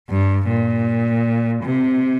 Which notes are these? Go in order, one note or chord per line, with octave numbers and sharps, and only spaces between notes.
G2
A#2
C3